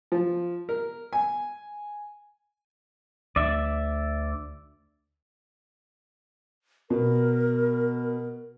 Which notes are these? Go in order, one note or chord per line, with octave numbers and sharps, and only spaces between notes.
F3
A#4
G#5
D2 D5 E5
B2 A#4